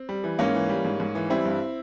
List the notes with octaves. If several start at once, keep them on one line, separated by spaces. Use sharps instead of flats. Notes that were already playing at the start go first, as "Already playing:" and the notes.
Already playing: C4
G3
E3
G#2 A#3 C#4
E3
G3
G#2
G#2
E3
G3 C4 E4
G2